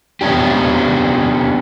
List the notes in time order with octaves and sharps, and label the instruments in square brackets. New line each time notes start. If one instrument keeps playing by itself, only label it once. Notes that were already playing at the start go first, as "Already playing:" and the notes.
[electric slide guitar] B3 C#4 D4 G4